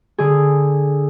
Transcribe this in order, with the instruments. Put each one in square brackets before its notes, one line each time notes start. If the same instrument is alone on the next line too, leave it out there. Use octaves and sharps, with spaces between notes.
[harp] D3 G#4